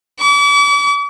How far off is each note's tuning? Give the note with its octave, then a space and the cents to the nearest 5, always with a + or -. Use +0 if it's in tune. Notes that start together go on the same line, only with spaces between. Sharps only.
D6 -45